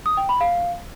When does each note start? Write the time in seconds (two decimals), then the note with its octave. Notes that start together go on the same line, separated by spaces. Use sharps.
0.06 D#6
0.17 G5
0.29 B5
0.41 F5